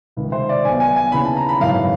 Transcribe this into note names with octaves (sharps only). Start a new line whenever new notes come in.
C#2 C3 D#3
C5
D5
B1 B2 G#5
G#5
G#5
D#2 C#3 E3 B5
A5
A#5
B5
G#1 F#2 C#3 E3 F5